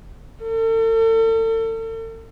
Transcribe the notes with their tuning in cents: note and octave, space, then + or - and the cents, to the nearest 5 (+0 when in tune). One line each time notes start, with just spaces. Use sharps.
A4 +40